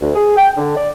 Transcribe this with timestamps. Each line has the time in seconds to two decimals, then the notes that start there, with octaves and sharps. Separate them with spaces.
0.01 D2
0.15 G#4
0.37 G5
0.57 D3
0.77 D5